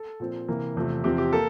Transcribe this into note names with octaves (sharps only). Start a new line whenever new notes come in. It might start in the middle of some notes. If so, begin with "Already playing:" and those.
Already playing: A4
A#2 F3 C4
C3 E3 A#3
E2 C3 F3 A3
E2 C3 F3 C4 G4
G4
A#3 A4